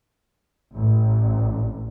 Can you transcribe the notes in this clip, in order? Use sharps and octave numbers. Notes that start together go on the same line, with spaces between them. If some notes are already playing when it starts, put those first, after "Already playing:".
A1